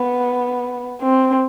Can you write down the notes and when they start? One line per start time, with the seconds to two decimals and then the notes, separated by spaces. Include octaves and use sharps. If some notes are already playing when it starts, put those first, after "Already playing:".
Already playing: B3
1.02 C4